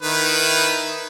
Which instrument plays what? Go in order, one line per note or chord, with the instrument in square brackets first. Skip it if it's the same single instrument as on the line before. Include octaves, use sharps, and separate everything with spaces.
[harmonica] D#3 E4 B4